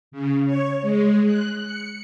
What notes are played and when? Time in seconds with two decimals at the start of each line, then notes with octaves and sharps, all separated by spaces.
0.12 C#3
0.45 C#5
0.82 G#3
1.25 F#6
1.65 C#7